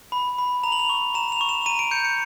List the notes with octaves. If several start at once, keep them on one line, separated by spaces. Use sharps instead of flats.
B5
B5
A#5 F7
F#7
F7
C#6
A#5 E7
F7
C#6
E7
A#5 D#7
D7
G6 C#7
C#7